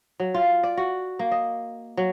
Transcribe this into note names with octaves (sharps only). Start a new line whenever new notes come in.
F#3
F4
D5
F#4
A#3
D#5
F#3